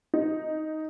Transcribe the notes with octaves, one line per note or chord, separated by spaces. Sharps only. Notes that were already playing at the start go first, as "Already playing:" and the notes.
D#4